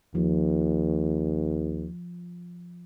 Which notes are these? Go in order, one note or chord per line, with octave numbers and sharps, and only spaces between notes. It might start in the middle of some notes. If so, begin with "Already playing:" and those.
D#2 F3